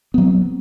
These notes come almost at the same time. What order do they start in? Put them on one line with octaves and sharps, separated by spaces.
B3 F#3 C4